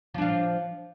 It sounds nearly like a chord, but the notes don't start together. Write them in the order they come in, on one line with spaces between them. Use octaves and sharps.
F3 D4 F4